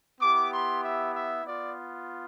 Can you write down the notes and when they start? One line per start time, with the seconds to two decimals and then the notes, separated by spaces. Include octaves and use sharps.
0.20 B3 E4 G4 D6
0.51 C6
0.82 E5
1.13 E5
1.43 B3 F4 D5